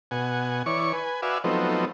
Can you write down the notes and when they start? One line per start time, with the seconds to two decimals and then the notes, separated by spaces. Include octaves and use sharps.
0.11 B2 F#5 G#5
0.66 E3 C#5 D5 C#6
0.93 B4 G#5
1.22 F#4 B4 D5 E5 F5 G#5
1.44 F3 F#3 A3 B3 C4 D#4